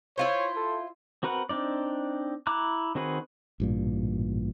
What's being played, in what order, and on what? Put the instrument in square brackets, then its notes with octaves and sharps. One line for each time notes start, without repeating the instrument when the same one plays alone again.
[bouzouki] E4 F4 C5 [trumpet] C#5
[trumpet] A4
[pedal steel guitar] C4 F#4 A#4 B4 F#5
C4 D4 D#4 D5
E4 A#5 D6 F#6
D#3 C4 F#4 G#4 B4
[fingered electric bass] A1 G2 A#2